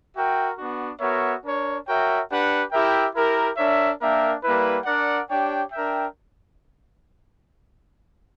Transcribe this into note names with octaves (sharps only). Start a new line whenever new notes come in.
F#4 A#4 E5 G5
B3 D4 F#4
B3 F#4 A#4 C#5 E5
D4 A#4 C#5
F#4 A#4 C#5 E5 G5
D4 G4 B4 F#5
E4 G4 A#4 E5 G5
E4 G4 A#4
D4 A#4 C#5 E5
A#3 D4 A#4 E5 G5
G3 A#3 E4 B4
D4 A#4 D5 F#5
D4 G4 C#5 G5
D4 A#4 E5 G5